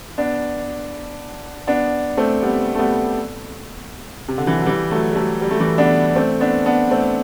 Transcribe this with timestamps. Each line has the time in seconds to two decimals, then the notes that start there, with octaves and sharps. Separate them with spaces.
0.18 B3 D4
1.67 B3 D4
2.17 A3 C4
2.42 G3 B3
2.75 A3
2.79 G3 B3
4.28 C3
4.38 D3
4.47 E3
4.57 F#3
4.66 E3 G3
4.91 F#3 A3
5.12 G3
5.16 F#3 A3
5.41 G3
5.51 A3
5.60 E3 G3
5.78 B3 D4
6.16 A3 C4
6.40 B3 D4
6.66 B3 D4
6.91 A3 C4